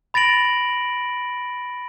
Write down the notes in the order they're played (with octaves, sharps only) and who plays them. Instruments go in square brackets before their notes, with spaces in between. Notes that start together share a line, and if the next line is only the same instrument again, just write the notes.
[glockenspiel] B5 A6 A#6 D7 F#7